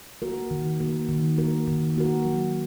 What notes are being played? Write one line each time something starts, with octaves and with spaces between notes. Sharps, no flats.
A#3 F#4 A#4
D#3
A#3 F#4 A#4
D#3
A#3 F#4 A#4
D#3
A#3 F#4 A#4
F#3